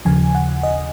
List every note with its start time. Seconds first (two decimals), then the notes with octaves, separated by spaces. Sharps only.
0.05 D#2 C#3 F3 G#5
0.35 F#5
0.63 D#5